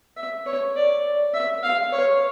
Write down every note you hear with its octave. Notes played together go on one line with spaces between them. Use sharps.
E5
C#5
D5
E5
F5
C#5